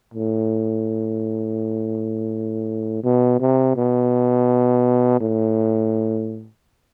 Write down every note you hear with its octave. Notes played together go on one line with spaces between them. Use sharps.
A2
B2
C3
B2
A2